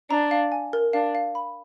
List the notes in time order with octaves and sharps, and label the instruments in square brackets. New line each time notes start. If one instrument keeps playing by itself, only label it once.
[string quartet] D4 [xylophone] A#5
[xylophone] F5
G#5
A#4
[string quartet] D4 [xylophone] F5
[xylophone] F5
B5